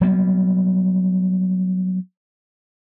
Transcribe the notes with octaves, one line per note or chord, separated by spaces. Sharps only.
F#3 G3 A#3 B3